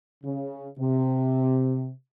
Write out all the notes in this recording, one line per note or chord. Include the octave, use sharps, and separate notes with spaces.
C#3
C3